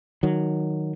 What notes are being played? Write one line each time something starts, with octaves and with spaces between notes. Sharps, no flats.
D#3 F#3